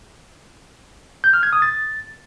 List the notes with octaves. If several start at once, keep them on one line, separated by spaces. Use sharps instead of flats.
G6
F6
G#6
D#6
A6